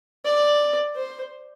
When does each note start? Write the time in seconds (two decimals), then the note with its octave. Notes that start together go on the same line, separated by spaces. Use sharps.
0.25 D5
0.96 C5